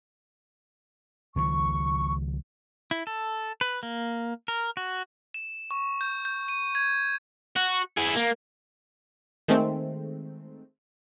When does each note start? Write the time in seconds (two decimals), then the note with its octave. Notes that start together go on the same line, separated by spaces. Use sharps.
1.36 C#2 D#3 F3 C#6
2.91 E4
3.07 A4
3.61 B4
3.83 A#3
4.48 A#4
4.77 F#4
5.34 E7
5.71 C#6
6.01 G6
6.25 G6
6.48 D#7
6.75 G#6
7.56 F#4
7.97 E4 G#4
8.17 A#3
9.48 D#3 G#3 A3 C4